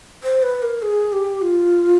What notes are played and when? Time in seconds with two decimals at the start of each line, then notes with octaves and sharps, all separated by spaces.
0.23 C5
0.42 B4
0.62 A#4
0.82 G#4
1.12 G4
1.42 F4